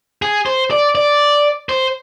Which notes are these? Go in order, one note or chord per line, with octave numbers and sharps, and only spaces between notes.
G#4
C5
D5
D5
C5